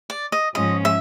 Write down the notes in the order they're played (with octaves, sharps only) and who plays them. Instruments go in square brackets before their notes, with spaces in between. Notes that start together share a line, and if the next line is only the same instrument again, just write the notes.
[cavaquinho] D5
D#5
[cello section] G#2 F3 G#3 C#4 [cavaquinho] D#5
[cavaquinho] E5